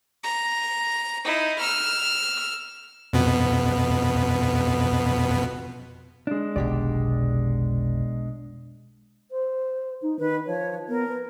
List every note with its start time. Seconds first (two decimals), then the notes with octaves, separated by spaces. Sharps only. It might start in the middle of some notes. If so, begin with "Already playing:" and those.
0.23 A#5
1.24 D#4 E4
1.58 E6 F6
3.13 F2 B2 B3
6.27 G#3 D4
6.56 F1 B1 B2 D#3 G4 D5
9.30 C5
10.02 D#4
10.19 D#3 B4
10.46 F3 C#5
10.89 B3 A#4
11.08 B4